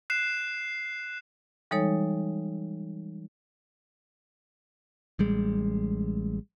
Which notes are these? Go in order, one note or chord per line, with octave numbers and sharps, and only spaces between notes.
F#6 C7 E7
E3 G3 G#3 D#4 A4 C#5
A1 G3 G#3